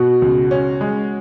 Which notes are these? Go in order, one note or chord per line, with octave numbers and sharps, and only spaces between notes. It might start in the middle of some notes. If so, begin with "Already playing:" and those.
Already playing: B2 F#4
C#2
C#4
G#3